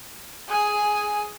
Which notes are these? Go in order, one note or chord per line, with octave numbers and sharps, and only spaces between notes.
G#4 G#5